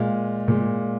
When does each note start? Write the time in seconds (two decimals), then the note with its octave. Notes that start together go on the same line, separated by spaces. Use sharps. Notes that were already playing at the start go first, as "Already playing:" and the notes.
Already playing: A#2 G#3 F5
0.48 A#2 G#3